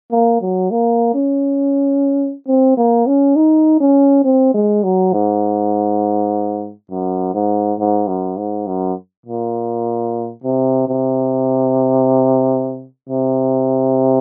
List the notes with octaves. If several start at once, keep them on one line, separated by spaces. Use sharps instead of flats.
A#3
F#3
A#3
C#4
C4
A#3
C#4
D#4
C#4
C4
G#3
F#3
G#2
F#2
G#2
G#2
F#2
G#2
F#2
A#2
C3
C3
C3